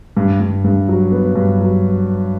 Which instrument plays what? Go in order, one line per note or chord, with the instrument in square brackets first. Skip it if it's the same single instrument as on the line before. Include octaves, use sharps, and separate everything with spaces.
[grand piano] G2
G2
G2
F#3
B3
G2
F#3